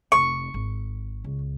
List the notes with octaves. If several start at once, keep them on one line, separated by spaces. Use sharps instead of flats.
F1 D#4 C#6
G#1
C#2